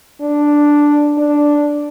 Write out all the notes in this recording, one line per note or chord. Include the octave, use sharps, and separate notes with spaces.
D4
D4